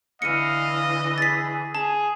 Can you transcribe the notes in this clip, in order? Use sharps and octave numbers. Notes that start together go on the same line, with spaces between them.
D3 E3 D#5 F5 C#7 D#7
G#4 A6 B6
G#4 A5